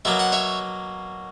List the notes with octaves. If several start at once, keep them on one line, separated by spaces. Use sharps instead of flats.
B2 F#3 A#3 E5
F#5
C#5 E5